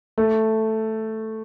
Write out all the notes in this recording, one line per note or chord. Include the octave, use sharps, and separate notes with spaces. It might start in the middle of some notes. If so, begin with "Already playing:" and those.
A3